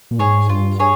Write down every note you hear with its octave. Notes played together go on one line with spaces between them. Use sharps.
A#2
G#2 G#4 C#5
G2 F4
G#4 C#5